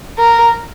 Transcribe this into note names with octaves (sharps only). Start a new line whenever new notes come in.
A#4